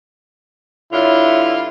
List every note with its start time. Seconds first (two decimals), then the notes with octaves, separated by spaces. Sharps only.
0.93 G2 D3 E4 F4 C#5